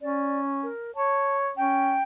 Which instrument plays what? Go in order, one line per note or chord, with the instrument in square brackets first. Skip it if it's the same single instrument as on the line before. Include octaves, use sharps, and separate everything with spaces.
[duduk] C#4 [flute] D5
[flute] A#4
[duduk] C#5 [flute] A5
[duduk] C#4 [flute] G5